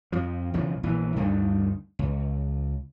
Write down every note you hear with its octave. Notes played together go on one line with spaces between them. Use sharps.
F2 F3
B1 E2 C#3 F3
A#1 E2 E3
D2 G2 D3 D#3
C#2